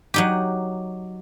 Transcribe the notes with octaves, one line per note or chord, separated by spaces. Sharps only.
F#3 D#4 G4